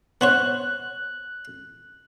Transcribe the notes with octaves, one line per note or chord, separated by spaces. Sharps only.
B3 C5 C#5 F#6